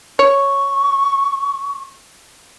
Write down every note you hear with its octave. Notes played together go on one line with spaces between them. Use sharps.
C#5 C#6